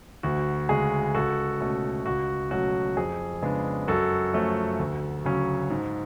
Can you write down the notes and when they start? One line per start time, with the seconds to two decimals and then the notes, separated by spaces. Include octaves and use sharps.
0.23 D2 F#4
0.69 C#3 G#3 G#4
1.15 C#2 F#4 A4
1.60 B2 A3 C#4
2.05 C#2 F#4
2.51 B2 F#3 A3 C#4 F#4
2.97 F2 G#4
3.42 C#3 G#3 B3 D4
3.88 F#2 F#4 A4
4.33 F3 A3 C#4
4.79 D2
5.24 C#3 F#3 C#4
5.70 G#2